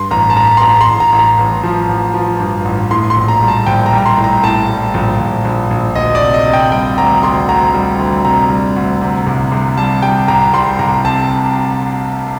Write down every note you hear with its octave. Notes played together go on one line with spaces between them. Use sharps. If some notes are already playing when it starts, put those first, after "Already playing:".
Already playing: G2 C6
A1 A#5
A5
A1 A#5
C6
A1 A#5
C6
A1
A#5
A1
A#5
A1
F3
A1
F3
G2
A1
A2 C6
C6
A#1
A#5
G3
A5
A#1 G5
A#5
G3
A#5
C6
A2
A#5
A2 A5
G3
A#1
A#1
A#1
A#1
D2 D#5
D5
C3
D#5
C3
G5
G3 G5
D2 A#5
D2 C6
D2 A#5
G3
D2
C3 A#5
G3
D2
C3
C2
C2
G3 A5
G3 G5
C2 A#5
G3 C6
C2 A#5
C3 A5